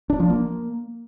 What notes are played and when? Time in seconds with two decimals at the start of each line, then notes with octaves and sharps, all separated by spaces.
0.10 D4
0.20 F3
0.30 A#3